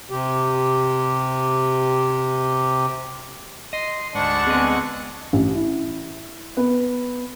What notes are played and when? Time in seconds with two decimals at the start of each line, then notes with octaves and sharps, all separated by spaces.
0.10 C3 G4
3.73 D#5 C6
4.15 D2 G#2 D4 F#5 C#6 C#7 E7
4.47 G#3 B3 C4 D#5
5.33 A1
5.55 E4
6.57 B3